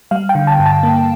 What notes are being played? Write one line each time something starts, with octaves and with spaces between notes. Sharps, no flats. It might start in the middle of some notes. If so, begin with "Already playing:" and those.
G3 F5
G5
D3
A5
G2
A5
A#3